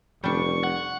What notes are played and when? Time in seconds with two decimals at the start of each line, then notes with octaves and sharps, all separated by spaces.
0.24 F1 G3 D4 C#6
0.63 F#5